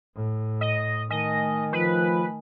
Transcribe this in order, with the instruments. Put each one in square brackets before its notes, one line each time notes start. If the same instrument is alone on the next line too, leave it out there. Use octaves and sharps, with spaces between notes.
[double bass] A2
[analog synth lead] D#5
[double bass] D#3 [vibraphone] A3 G#5 [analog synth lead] D#5
[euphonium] F3 [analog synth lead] B4